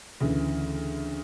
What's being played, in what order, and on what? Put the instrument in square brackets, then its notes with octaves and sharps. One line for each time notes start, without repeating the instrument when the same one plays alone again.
[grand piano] D2 C#3 E3